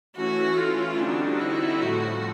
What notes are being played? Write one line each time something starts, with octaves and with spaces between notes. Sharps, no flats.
E3 A3 C#4 E4 F#4
F4
D3 G3 C4 D4 D#4 F#4
E4
A2 F3 A3 F#4